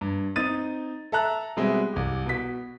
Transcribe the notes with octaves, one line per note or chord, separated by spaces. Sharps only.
G2
C4 D#4 D#6 A6 D#7
A4 E5 A5 A#5 F#6
B2 G3 G#3 C4 E5
C2 G4
B2 B6